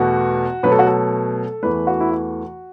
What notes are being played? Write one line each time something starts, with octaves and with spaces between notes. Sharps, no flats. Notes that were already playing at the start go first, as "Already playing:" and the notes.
Already playing: E2 B2 A3 F#4
B2 F#3 A3 B4
A4
F#4
A4
E2 E3 A3 B4
F#4
E4
F#4